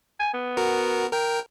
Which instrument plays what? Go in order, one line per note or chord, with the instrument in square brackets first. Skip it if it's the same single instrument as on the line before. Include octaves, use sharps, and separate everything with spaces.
[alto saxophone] G#5
B3
[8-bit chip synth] F#4 A#4
A#4 G5